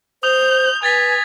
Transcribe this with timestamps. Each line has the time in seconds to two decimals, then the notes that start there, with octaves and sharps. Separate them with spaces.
0.23 C5 D#6 G6 F7
0.83 B4 G#5 G#6 A6 B6